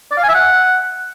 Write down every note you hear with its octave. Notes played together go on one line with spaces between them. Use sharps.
D5
F5
G#5
E5
F#5